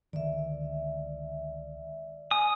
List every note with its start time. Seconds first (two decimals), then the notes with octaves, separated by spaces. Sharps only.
0.13 C#2 D3 D#3 D5 E5
2.31 G#5 D#6